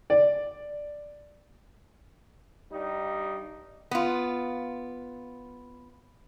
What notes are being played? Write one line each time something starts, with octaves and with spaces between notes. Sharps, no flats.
D5
G2 G3 D#4
B3 F4